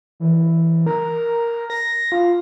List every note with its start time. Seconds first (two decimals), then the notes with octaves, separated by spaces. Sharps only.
0.20 E3
0.86 A#4
1.70 A#6
2.12 F4